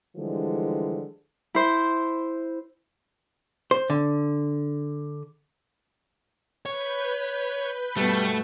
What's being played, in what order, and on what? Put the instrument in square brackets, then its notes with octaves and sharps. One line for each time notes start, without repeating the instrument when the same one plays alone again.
[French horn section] D3 E3 F3 G3 G#3
[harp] E4 C5
[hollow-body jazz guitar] C5
D3
[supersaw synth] B4 G6 [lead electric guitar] C#5
[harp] G2 B2 [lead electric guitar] G3 [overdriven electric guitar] A3